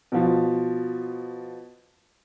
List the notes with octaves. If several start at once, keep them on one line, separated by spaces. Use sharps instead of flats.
B2 F3